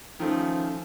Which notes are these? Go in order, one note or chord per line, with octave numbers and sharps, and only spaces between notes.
D#3 F3 A3 C#4